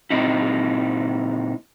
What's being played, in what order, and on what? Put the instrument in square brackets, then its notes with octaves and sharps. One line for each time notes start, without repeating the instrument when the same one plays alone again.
[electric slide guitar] A#2 C4 D#4 E4